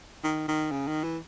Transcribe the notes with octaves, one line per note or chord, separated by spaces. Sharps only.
D#3
D#3
C#3
D#3
E3